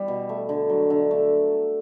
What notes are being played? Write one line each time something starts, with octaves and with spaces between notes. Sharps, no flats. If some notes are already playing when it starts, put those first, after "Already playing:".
Already playing: E3 G3 B3
B2
A3
D3
F#3
D3
A3